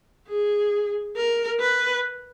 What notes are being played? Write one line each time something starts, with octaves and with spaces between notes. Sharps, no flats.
G#4
A#4
B4